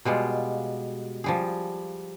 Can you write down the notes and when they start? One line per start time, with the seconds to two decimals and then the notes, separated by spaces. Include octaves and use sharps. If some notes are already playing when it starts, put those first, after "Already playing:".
0.05 B2 G3 G#3 F4
1.24 F3 G3 G#4